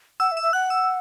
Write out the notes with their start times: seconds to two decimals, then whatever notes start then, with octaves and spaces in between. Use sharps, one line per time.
0.20 F#5 E6
0.32 E5
0.37 E6
0.43 E5
0.53 F#5 F#6
0.70 E6